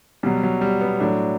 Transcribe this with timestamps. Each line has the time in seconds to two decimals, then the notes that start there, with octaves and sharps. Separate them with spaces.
0.23 B2 F#3 G3
0.43 F#3
0.61 G3
0.81 B3
1.00 A2 F#3 D4